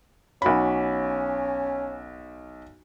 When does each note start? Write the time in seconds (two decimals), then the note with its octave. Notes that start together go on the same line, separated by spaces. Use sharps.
0.42 B1 C#4 F#4 B5